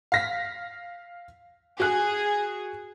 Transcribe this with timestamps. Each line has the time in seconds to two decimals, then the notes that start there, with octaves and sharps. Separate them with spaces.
0.12 F5 A#6 B6
1.80 F#4 G#4 F#6